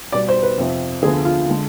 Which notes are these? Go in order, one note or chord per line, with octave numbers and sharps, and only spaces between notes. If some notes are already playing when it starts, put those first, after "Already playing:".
B2 G3 B3 D5
C5
B4
F2 C3 F3 C4
D2 D3 F3 B3 G#4
F4
D3 G#3